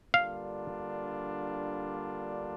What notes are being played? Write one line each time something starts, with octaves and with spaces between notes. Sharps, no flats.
D3 G3 A#3 D4 F4 F5